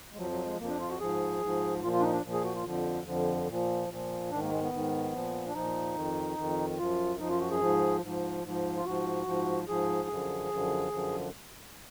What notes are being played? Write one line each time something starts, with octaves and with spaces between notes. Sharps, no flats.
G#3
F2 F3 F#3
F#3
G#3
F2 F3 A#3
D4
F4
F#4
G#2 F3 G#4
G#2 F3
A#2 F3 F4
F4
D4
D#4
D4
A#2 F3
G#4
F#4
F4
F2 D3 F3
F2 D3 F3
A#2 F3
A#2 F3
G#2 D#3 D4
A#3
G#3
B3
G#2 D#3
A#2 F3
D4
A#2 F3 D#4
F2 D#3
F2 D#3
F#2 F3 F4
F#2 F3 D#4
F4
F#4
G#4
G#2 F3
G#2 F3
G#2 F3
F4
G#2 F3 F#4
G#2 F3
G#2 F3 G#4
F#2 D3 F3
F#2 D3 F3
F#2 D3 F3